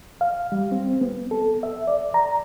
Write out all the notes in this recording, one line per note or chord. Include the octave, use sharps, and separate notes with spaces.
F5
G3
C4
B3
A4
E5
D5
A#5